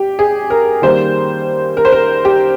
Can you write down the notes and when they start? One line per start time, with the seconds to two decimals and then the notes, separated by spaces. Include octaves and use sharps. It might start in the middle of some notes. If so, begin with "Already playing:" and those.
Already playing: G3 G4
0.19 G#4
0.50 A#4
0.82 D#3 G3 A#3 C5
1.77 A#4
1.85 C5
1.92 A#4
2.25 G4